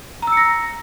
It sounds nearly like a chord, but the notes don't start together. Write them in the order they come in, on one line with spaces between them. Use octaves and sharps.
A#5 E6 C#7 A#6